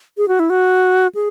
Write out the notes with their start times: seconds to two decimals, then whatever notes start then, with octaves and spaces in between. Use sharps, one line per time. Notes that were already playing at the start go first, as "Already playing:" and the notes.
0.18 G#4
0.28 F#4
0.39 E4
0.50 F#4
1.15 G#4